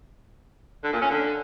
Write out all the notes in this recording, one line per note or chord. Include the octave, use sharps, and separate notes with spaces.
D3
A#2
C#4
D3